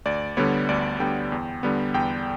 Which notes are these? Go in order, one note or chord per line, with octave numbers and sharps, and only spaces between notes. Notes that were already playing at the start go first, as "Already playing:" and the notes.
D2 D5
D3 G3 B3 C#5
D2 D5
D3 G3 B3 G5
E2
D3 G3 B3
E2 G5